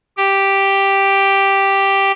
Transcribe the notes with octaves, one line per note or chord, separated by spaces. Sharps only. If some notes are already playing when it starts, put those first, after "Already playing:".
G4 G5